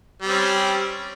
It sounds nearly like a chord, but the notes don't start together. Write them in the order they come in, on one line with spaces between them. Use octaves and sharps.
G3 C4 C#4